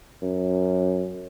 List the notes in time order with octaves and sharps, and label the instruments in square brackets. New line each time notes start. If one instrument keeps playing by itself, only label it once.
[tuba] F#2